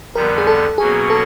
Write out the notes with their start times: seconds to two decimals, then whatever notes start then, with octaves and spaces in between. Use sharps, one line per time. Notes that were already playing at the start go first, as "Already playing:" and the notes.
0.15 F2 D3 G3 B3 A#4
0.38 G#4
0.47 A4
0.78 B2 F#3 A#3 C#4 G#4
1.10 A4